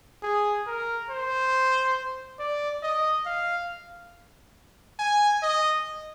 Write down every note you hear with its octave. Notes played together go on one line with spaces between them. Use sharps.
G#4
A#4
C5
D5
D#5
F5
G#5
D#5